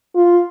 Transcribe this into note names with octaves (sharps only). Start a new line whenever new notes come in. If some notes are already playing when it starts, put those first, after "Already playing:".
F4